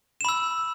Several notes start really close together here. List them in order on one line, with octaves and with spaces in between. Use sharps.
E7 B5 E6